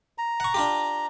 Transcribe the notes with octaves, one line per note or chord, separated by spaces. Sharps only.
A#5
F#5 C#6
D4 F4 G4